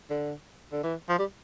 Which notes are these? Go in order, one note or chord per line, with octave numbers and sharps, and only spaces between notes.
D3
D3
E3
F3
G3